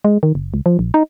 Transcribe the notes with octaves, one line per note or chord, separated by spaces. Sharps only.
G#3
D#3
F#1
C#2
F3
A#1
D#4